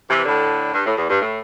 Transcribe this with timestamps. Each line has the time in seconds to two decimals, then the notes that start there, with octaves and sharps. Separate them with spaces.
0.08 C3 E3
0.25 A2 D3
0.73 G2
0.85 A2
0.97 E2
1.09 G2
1.22 A2